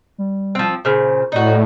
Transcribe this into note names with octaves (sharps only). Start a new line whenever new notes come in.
G3
F3 C4
A#2 C#3 C5
A2 D#4 F#4 D5